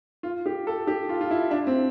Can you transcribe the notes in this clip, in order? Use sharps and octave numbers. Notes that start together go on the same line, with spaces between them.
F4
G4
A4
G4
F4
F4
E4
D4
C4